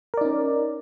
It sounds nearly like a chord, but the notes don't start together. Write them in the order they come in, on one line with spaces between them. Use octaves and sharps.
A#4 D5 D#4 C#4